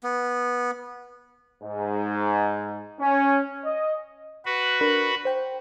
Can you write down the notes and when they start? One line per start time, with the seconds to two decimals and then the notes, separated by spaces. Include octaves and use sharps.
0.03 B3
1.64 G#2
3.00 C#4
3.65 D#5
4.45 F#4 B4
4.81 D4 A#4 B5
5.25 C5 G5